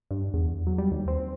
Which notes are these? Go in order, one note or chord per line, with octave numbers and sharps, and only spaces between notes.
G2
E2
F#3
G3
D#2
C4